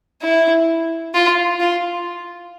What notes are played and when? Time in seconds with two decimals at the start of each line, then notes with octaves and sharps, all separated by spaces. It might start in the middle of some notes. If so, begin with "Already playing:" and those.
0.22 E4
1.14 F4
1.60 F4